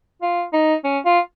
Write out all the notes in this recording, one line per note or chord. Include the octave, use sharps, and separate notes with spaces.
F4
D#4
C#4
F4